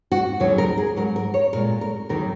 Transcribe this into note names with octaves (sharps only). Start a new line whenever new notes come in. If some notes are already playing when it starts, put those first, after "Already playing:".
F#4
D#2 C#3 F#3 C#5
A#4
G#4
G#2 F#3 A#4
A#4
C#5
A#2 G#3 A#4
A#4
D#2 D#3 F#3 A#4